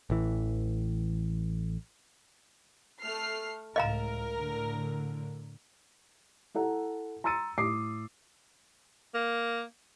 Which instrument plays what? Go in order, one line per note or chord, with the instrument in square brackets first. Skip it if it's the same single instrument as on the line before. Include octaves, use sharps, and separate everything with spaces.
[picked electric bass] A1 E3
[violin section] A3 F6 C7
[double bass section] C#2 A2 [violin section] A#4 [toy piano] D#5 F5 A#5
[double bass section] A2 D3
[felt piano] E4 A4 F#5 A#5
A#5 C6 E6 A6 C#7 D#7
A2 D6 D#6 C7
[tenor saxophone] A#3